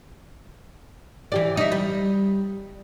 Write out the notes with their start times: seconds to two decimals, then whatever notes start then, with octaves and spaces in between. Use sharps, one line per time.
1.32 E3 G4 D5
1.57 D#4 E4
1.72 G3